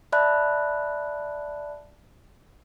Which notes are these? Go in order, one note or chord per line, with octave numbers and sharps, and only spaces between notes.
D5 E5 A5 B5 F#6